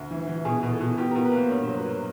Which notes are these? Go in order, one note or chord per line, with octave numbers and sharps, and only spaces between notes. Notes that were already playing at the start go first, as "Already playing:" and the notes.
Already playing: D2
E3
E3
B2 G#4
B2
A4
B2
B2 G4
A#4
B2
B4
A#3 C5
G2 C#5
C5
F#3
B4
F#3 A#4